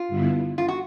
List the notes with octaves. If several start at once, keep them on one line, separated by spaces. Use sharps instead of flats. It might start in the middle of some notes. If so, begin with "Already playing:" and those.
Already playing: F4
G2 D3 G3 B3 E4
F4
F#4